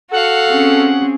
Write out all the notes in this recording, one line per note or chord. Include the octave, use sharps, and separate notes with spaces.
F#4 A4 F5 F#5
C4 C#4 G#4